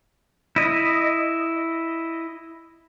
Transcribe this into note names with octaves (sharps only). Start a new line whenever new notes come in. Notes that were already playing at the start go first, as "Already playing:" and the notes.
E4 D#5